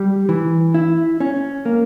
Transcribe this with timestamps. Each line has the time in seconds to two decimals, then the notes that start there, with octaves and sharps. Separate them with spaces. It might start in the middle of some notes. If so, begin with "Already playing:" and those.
Already playing: G3
0.29 E3
0.74 E4
1.20 C#4
1.65 A#3